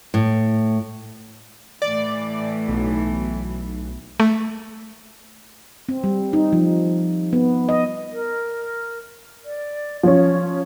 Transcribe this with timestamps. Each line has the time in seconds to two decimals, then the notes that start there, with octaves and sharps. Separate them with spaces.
0.14 A2
1.82 A2 E3 D5
2.68 B1
4.20 A3
5.89 C4
6.04 G3
6.33 D#4
6.53 F3
7.33 B3
7.69 D#5
8.13 A#4
9.45 D5
10.03 F3 C#4 C#5